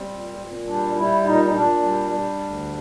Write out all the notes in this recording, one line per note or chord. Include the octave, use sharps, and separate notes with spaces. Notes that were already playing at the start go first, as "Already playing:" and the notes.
Already playing: G3 C4
A#2
A#2
G3 D4
G3 E4
A#2 D#4
D#4
A#2 D4
G3
G3
D2